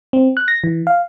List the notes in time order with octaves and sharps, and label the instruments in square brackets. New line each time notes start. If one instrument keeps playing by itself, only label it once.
[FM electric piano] C4
F#6
A#6
E3
F5